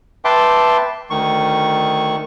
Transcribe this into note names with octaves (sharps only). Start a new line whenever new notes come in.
B4 E5 G5 A5 C6 D6
D2 D#3 C#6